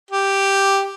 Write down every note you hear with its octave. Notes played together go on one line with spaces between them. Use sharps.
G4